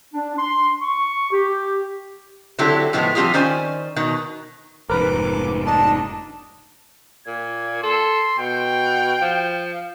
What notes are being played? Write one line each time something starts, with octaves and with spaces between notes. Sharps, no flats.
D4
C6
C#6
G4
D3 F#3 C4 E4 G4 A4
A2 F3 G#3 B3
F3 G3 C4 F4 G4 G#4
D#3 C#4 C5 D5 G#5
B2 D#3
F1 G#2 A#4 B4 D6
D4 D#4 A5
A#2 G#6
A4 C6
B2 G5
F3